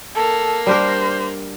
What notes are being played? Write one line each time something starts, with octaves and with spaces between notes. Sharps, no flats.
A#3 A4
G3 D4 A#4 C5